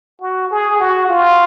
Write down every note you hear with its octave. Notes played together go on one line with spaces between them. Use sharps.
F#4
G#4
F#4
F4